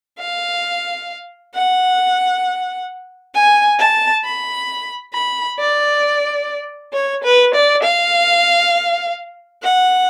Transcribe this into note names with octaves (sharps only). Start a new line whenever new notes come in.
F5
F#5
G#5
A5
B5
B5
D5
C#5
B4
D5
F5
F#5